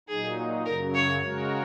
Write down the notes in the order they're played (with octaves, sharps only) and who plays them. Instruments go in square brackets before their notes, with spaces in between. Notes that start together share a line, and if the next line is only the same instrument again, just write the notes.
[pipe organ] A#2 F#3 D#4 [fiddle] G#4
[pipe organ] F#2 C#3 F#3 [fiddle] A#4
[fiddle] C#5
[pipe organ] C#3 G#3 F#4 A#4 C#5